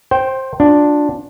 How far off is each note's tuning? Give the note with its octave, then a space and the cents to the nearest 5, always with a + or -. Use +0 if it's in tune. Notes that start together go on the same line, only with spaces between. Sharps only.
C5 +15 G5 -10
D4 +0 F4 +35